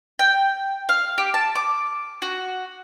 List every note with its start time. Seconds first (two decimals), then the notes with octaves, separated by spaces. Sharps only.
0.19 G5
0.89 F5
1.18 G4
1.34 A5
1.55 D6
2.22 F#4